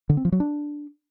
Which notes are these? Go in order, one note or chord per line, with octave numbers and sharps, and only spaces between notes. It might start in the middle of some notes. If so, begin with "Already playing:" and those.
D3
C4
F3
F#3
D4